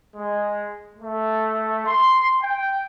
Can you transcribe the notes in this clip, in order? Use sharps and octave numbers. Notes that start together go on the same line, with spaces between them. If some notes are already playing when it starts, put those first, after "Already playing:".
G#3
A3
C6
G5